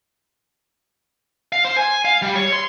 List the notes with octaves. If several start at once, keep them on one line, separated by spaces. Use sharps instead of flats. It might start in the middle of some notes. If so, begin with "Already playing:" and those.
F5
C5
G#5
F5
G3
C#5
C6